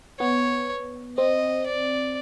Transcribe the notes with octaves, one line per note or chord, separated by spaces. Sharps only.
B3 C#5
C4 D#5
D5